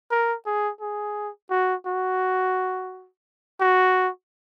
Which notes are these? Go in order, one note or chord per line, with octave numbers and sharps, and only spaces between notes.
A#4
G#4
G#4
F#4
F#4
F#4